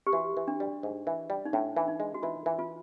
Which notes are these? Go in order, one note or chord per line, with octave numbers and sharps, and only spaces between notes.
G4
E3 F#4
E3
D4
G3
G#2
E3
G3
D#4
A2 D4
E3
D#4
G#3
F#4
E3 F4
E3
F4